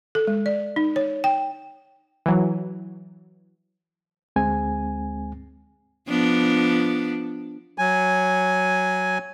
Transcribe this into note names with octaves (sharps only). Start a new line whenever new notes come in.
A4
G#3
D5
D#4
C#5
G5
E3 F#3
D2 G#3 C4 G#5
F3 B3 D4
F#3 G#5